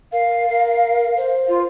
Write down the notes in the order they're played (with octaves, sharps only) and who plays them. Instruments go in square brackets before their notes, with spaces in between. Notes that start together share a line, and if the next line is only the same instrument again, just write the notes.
[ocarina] A#4 [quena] F5
[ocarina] A#4
C5
[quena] F4